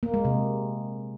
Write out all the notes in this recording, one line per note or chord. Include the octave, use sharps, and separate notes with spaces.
A#3
G#3
C3